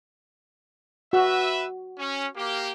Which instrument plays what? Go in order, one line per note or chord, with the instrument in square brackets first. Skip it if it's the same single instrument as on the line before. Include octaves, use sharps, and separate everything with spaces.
[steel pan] F#4 [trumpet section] B4 E5
[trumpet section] C#4
A#3 G4